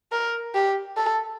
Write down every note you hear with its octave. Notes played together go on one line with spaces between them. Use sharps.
A#4
G4
A4